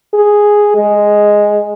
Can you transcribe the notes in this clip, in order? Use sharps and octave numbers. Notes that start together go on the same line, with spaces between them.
G#4
G#3